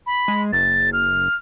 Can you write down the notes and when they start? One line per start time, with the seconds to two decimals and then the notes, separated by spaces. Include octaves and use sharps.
0.06 B5
0.28 G#3
0.53 F#1 A6
0.93 F6